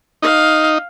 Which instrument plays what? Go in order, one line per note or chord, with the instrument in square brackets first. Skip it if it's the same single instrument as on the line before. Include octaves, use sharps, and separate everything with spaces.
[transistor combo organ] D#4 [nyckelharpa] F5